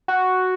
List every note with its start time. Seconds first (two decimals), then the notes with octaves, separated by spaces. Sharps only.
0.08 F#4